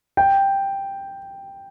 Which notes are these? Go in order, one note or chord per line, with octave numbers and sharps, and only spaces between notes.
G5